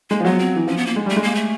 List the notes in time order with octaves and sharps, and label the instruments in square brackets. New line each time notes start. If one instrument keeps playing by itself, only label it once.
[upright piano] G#3 [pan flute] A#3
[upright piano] F3
[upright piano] F#3 [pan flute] B3
[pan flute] C4
[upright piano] E3
[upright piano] F3 [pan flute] C#4
[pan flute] B3
A#3
[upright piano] G#3
[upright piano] G3 [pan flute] A3
[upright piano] G#3
[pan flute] A#3
A3